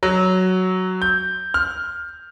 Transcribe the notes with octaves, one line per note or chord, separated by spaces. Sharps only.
F#3
G6
F6